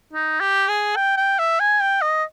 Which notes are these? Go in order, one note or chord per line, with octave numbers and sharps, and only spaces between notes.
D#4
G4
G#4
G5
G5
E5
G#5
G5
D#5